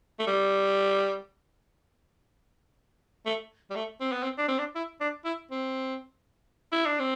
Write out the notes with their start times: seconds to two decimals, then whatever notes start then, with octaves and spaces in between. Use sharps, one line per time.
0.19 A3
0.27 G3
3.26 A3
3.70 G3
3.76 A3
4.00 C4
4.12 B3
4.23 C4
4.38 D4
4.48 C4
4.59 D4
4.75 E4
5.01 D4
5.25 E4
5.51 C4
6.72 E4
6.86 D4
6.99 C4